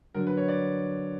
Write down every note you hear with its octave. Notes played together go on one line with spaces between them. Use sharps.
D3 F#3 A#4
B4
C#5
D5